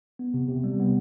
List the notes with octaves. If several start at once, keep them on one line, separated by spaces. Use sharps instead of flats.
B3
C3
C3
G3
B3